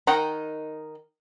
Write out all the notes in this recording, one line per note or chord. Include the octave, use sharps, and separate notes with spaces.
D#3 D#4 F#5 G5 A#5